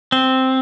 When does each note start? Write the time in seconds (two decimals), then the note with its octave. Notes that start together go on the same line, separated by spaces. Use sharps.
0.12 C4